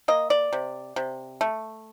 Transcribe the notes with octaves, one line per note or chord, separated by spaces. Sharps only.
A#3 D#5
D5
C3
C3
A3